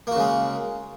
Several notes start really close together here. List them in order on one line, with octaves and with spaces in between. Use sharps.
A#3 F#4 C#3 G#3